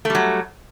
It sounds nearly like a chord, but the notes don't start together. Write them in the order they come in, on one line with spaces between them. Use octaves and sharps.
A3 G3 F#3